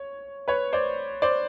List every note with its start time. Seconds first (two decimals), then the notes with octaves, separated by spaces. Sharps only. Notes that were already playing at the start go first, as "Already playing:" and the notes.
Already playing: C#5
0.48 B4 C#5
0.73 C5 D5
1.22 C5 D5